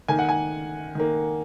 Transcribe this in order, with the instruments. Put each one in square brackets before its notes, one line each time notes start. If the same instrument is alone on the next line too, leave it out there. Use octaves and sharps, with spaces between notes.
[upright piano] D#3 A#3 G#5
F#5
G#5
D#3 A#3